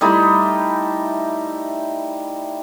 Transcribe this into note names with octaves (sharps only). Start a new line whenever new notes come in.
G3 A3 D#4 E4